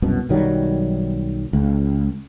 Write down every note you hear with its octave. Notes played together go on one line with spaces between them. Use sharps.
C2 F#2 B2
B1 D#3 F#3 G3
C#2